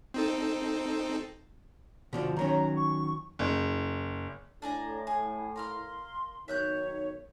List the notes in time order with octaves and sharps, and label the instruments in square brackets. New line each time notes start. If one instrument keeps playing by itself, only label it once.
[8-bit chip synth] C4 D#4 A4
[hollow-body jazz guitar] B2 D3 F3
[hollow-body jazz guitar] D#3 F#3 C#4 [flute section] A#5
[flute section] C#6
[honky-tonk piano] F#1
[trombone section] A2 [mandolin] D4 G#5 A#5
[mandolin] G#4
[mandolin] A#4 F5 F6 [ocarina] C6
[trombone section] B1 D#3 [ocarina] C#5 [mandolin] E5 F#6 G6